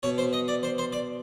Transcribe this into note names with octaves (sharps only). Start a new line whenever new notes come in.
B2 C#5
C5
D#5
D5
C5
C5
D5